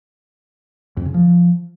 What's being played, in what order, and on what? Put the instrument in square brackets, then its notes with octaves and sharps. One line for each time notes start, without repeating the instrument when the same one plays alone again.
[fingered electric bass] F2
C#3
F3